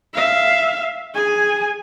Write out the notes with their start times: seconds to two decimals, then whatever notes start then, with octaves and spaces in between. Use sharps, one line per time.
0.14 E5 F5
1.15 G#4 G#5